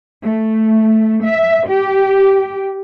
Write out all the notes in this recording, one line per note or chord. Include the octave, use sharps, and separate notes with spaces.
A3
E5
G4